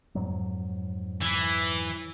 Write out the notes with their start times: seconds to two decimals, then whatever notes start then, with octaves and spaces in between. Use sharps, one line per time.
0.15 F2 G#2 F#3
1.22 E3